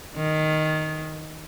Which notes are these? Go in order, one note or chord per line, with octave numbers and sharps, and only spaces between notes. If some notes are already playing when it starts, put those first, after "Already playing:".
D#3